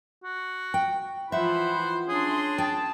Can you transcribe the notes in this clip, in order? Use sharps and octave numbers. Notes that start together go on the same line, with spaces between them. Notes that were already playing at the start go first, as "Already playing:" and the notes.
F#4
G5
E3 F3 C5 E5 F#5 B5
C#4 D4 G#4 C6
G5 A5